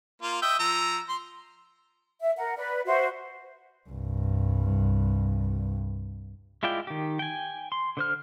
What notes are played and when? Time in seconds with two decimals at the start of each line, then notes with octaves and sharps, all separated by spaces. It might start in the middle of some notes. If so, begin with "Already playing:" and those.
0.22 A#3 F4
0.42 D#5 E5 G5
0.59 F3 A#5 E6
1.09 C6
2.22 E5
2.37 A#4 F#5
2.56 B4 D5
2.86 F#4 C5 E5
3.89 C2 G2
6.63 G#3 E4 F4 D5 G5
6.87 D#3 G4
7.19 G5 G#5
7.72 C6
7.97 D3 C5 F6